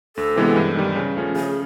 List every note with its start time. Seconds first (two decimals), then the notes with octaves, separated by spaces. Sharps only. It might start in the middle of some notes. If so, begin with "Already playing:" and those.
0.16 D2 A4
0.36 C3 E3 G#3 B3
0.56 G2
0.76 D#3 G3
0.96 C#3
1.17 F3 A3 C#4
1.35 C#3 G#4